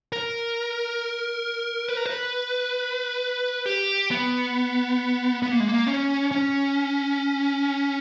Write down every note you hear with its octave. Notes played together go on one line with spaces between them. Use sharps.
A#4
B4
A#4
B4
G4
B3
B3
A#3
G#3
A#3
C#4
C#4